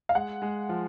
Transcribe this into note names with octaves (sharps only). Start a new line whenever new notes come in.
F5
G#3 F#5
G#3
F3